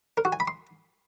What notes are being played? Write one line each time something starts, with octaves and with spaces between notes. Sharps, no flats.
A#4
F#4
G#5
B5
C6